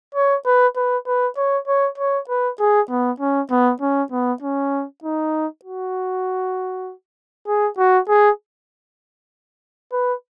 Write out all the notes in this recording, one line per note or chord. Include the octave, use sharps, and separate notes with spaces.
C#5
B4
B4
B4
C#5
C#5
C#5
B4
G#4
B3
C#4
B3
C#4
B3
C#4
D#4
F#4
G#4
F#4
G#4
B4